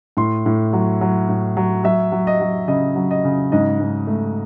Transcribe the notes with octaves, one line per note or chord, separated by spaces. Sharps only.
A2 C6
A2
F#3
F#3
A2
F#3
F#3 E5
F#3
D#5
F#3
C#3 D#5
F#3
D#5
C#3
G#2 D#5
G#2
A3